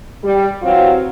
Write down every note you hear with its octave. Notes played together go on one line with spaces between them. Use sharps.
G3
E3 F#3 C4 F4